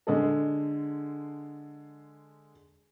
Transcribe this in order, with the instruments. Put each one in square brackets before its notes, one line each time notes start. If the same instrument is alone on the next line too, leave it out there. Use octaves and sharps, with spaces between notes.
[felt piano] D3 G#3 A4